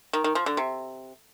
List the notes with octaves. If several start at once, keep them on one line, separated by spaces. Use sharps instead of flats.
D#3
D#3
F3
D3
C3